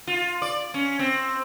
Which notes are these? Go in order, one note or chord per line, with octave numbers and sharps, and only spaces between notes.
F4
D5
C#4
C4